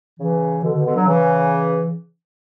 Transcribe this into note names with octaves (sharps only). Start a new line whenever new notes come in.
C#3 E3
B2 D3
B2 D3
B2 D3
D3 F#3
C#3 E3